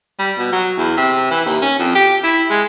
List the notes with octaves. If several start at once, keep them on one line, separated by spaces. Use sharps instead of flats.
G3
B2
F#3
E2
C3
E3
D#2
C#4
F2
G4
E4
G#3